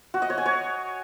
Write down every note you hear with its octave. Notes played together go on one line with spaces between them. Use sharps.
F#4
D#5
C#5
G#5
C#5